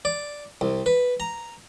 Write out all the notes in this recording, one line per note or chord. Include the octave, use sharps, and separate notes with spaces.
D5
C2
B4
A#5